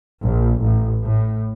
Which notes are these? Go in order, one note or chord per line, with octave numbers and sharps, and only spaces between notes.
A#1
A1
A2